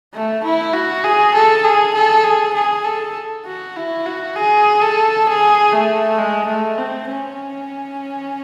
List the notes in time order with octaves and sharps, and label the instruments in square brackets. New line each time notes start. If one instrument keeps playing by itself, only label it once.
[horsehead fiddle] A3
E4
F#4
G#4
A4
G#4
A4
G#4
G#4
A4
F#4
E4
F#4
G#4
A4
G#4
A3
G#3
A3
C4
C#4